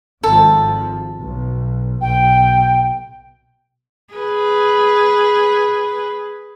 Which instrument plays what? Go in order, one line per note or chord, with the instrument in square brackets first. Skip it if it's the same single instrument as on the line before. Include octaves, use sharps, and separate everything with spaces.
[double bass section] G#1 F3 [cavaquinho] A4
[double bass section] B1
[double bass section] B1 [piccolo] G5
[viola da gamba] G#4 B4